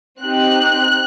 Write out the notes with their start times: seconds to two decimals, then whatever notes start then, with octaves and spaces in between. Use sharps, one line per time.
0.21 C4 D#4 G4 F#6